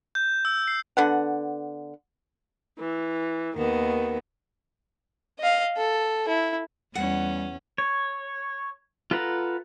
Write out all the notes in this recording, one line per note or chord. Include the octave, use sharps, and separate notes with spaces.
G6
E6
C7
D3 B3 F#5
E3
D#2 D#3 B3
D#5 F5
A4
E4
E2 G3 C#4 F#5
C#5
F4 A4 B4 F#5 A#5